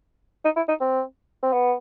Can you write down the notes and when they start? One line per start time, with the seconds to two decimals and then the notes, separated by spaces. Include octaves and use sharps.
0.45 D#4
0.56 E4
0.69 D#4
0.81 C4
1.43 C4
1.53 B3